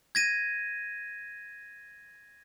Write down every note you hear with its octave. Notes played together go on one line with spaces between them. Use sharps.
G#6 A#6 D#7